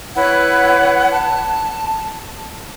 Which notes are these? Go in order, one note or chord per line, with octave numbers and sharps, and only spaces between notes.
E4 B4 C#5 F#5
A5